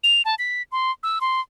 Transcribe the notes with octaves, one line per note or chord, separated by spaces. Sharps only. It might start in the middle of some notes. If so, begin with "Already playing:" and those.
F7
A5
B6
C6
E6
C6